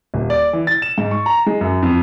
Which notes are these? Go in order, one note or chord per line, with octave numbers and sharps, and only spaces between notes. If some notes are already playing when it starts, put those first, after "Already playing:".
D#1
D5
E3
A6
E7
G#2
C#6
A#5
G#3
F#2
F2